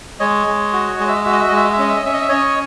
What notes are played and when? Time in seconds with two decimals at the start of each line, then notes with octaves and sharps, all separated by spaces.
0.20 G#3 C#5 D#5
0.47 G#3
0.73 F#4
1.00 G#3 D#5
1.08 E5
1.15 D#5
1.24 F#4 E5
1.32 D#5
1.40 E5
1.48 D#5
1.52 G#3 E5
1.64 D#5
1.73 E5
1.79 C#4 D#5
1.89 E5
1.96 D#5
2.05 C#4 E5
2.13 D#5
2.21 E5
2.29 C#4 C#5 D#5